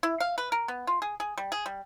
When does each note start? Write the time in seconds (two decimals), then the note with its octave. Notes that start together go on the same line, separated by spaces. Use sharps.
0.03 E4
0.20 F5
0.38 B4
0.52 A#4
0.68 B3
0.87 F4
1.02 G#4
1.20 G#4
1.38 G3
1.52 G#4
1.66 G3